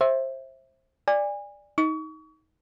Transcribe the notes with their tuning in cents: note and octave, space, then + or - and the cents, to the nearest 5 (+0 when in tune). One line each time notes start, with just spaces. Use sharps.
C5 +25 E5 +0
D5 +5 G#5 -30
D#4 +20 C#6 +35